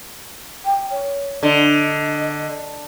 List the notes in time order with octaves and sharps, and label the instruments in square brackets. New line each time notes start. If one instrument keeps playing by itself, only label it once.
[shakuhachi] G5
C#5
[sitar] D3 [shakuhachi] D#5